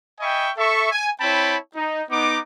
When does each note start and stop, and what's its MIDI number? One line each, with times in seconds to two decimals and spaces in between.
0.20 0.49 75
0.20 0.49 76
0.20 0.49 79
0.20 0.49 80
0.20 0.49 83
0.20 0.49 85
0.57 0.91 69
0.57 0.91 76
0.57 0.91 85
0.91 1.09 80
1.21 1.55 60
1.21 1.55 64
1.21 1.55 73
1.21 1.55 79
1.21 1.55 81
1.21 1.55 83
1.75 2.02 63
2.10 2.39 59
2.10 2.39 63
2.10 2.39 86